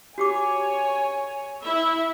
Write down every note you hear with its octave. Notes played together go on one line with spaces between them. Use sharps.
F#4 G4 C#5 G#5 D6
E4 E5